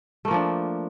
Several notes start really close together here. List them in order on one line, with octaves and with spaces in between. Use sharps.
A3 A#3 F3 D4